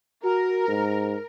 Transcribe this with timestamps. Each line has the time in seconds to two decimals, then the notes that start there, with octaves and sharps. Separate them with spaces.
0.24 F#4 A#4
0.68 G#2